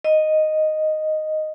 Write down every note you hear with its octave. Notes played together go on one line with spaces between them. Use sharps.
D#5